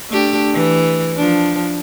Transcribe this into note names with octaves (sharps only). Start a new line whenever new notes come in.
A3 D4 G4
E3
F3 D4